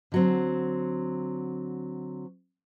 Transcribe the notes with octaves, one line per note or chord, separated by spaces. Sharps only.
D3 F#3 C4